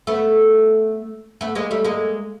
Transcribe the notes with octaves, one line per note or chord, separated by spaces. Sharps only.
A3 B3
A3 B3
G#3 A#3
G3 A3
G#3 A#3